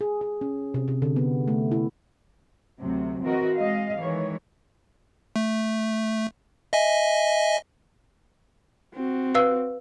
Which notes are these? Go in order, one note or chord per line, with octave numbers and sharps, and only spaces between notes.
G#4
G#4
C#4
C3
C3
D3
B3
A3
E4
D2 C3 F#3
E3 C4 F#4 A#4 D#5
G#3 D#5 F5
D#3 E3 G#3 C#5
A3
D#5 E5 G#5
C4 F#4
B4 F5 E6